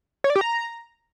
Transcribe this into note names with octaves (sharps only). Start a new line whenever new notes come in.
C#5
D5
G4
A#5